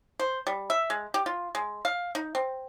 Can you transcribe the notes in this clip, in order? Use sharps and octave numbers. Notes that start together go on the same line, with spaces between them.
C5
G3
E5
G#3
G4
F4
G#3
F5
D#4
C4